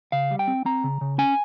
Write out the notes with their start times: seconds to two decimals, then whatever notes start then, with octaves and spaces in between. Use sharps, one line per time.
0.12 C#3 F5
0.31 G3
0.39 G5
0.48 C4
0.65 C4 A#5
0.84 C#3
1.01 C#3
1.18 C#4 G#5